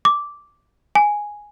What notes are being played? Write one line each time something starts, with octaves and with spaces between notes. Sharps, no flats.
D6
G#5